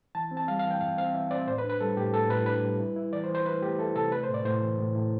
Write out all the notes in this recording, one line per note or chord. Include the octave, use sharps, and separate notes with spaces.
E3 A5
C4
A5
G3 F5
F5
E3
G5
G2 F5
C4 F5
E3 E5
C4 D5
A2 C5
B4
D4
B4
G3 A4
A2 G4
A2 A4
A2 B4
D4 B4
G3
E4
E4
E3 D5
C5
E3
C5
E4 B4
A3 G4
E4 A4
C3 A4
A3 B4
C5
A2
D5
A2 C5
E3
A2
A2